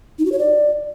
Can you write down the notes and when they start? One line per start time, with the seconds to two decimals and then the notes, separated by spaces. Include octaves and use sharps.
0.19 D#4
0.25 F#4
0.32 C#5
0.39 D5